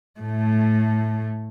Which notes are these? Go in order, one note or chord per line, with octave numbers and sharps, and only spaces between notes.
A2 A3